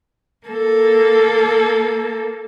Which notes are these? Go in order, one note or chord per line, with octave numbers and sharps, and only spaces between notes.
A#3 A4